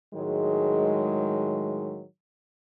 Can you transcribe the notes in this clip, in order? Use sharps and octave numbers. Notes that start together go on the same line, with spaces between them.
A2 D#3 F#3 G#3